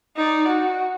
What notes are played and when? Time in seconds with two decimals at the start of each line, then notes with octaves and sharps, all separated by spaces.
0.17 D#4 D5
0.47 F#4